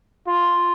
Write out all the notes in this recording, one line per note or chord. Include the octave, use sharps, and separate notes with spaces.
F4